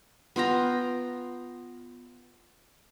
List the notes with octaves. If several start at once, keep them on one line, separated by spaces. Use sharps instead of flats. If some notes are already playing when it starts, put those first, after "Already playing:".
B3 F4 G5 A#5